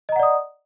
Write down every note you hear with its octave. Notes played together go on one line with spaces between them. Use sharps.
D5 D#5 F#5 A#5 D#6